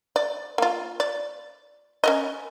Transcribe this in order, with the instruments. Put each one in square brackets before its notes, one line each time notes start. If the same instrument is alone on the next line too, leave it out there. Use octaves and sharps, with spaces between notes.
[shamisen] D5
A#3 F4
D5
C#4 A#4 D#5